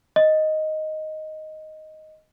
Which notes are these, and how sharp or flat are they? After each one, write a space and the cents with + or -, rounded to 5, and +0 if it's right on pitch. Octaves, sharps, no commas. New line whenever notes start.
D#5 +0